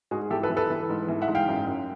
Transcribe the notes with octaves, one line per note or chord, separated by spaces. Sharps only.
G#2 F#4 G#4
E3 G4 A4
A4 B4
E3
A4 B4
E3
G#2
E3
E5 F#5
G#2
F5 G5
F#2
F#2